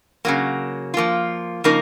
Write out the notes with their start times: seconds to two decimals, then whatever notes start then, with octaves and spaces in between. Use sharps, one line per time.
0.25 C#3 F#3 A#3
0.94 F3 A#3 F4
1.64 C#3 F3 A#3 D#4 A#4